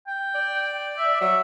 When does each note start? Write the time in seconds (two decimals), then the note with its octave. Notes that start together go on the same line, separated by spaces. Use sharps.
0.07 G5
0.35 D5
0.98 E5
1.21 F#3 E5